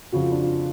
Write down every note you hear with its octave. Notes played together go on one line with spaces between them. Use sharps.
F2 C#3 F#4
F4
D4
F4